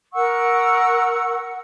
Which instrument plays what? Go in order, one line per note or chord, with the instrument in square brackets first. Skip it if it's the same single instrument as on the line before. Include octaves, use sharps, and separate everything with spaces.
[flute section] A#4 F#5 C#6 E6